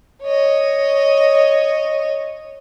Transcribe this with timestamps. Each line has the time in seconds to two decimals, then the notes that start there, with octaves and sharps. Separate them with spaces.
0.22 C#5 D#5